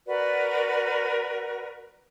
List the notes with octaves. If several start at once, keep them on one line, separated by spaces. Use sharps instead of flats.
F#4 A#4 B4 D5